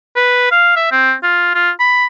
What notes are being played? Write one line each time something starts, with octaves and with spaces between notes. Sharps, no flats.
B4
F5
E5
C4
F4
F4
B5